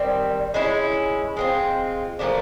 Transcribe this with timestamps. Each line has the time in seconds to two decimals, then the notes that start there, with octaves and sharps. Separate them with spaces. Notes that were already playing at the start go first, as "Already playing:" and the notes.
Already playing: D#3 G3 C4
0.54 G#3 C#4 E4
1.37 G#3 C4 F4
2.19 A#2 F3 A3 D4